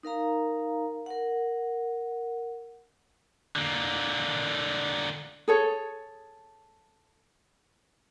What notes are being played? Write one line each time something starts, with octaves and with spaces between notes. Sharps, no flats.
D#4 A#4 F5 A#5
A#4 F#5
D3 A#3
G#4 A4 C#5